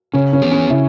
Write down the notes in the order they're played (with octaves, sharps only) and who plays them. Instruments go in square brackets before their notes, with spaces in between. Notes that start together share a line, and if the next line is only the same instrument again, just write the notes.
[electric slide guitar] C#3 [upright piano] C#4
[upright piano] C#4
[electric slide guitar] E3 B3 G#4
[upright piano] C#4
[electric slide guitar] C#3 [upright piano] E4